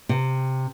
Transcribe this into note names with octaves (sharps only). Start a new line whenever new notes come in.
C3